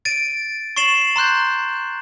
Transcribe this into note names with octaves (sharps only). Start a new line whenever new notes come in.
A6 D7 D#7
C#6 A6 C7 E7 F#7
A#5 C6 F#6 G6